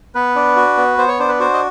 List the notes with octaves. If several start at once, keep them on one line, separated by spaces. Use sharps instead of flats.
B3 B4
D4
F#4
B3
B3 C5
C#5
D4 C5
B4
F#4 C5
D#5